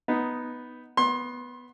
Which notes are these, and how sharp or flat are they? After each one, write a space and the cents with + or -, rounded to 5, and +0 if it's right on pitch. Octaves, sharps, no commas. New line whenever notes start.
B3 +0 D#4 +0
B3 +0 C6 +30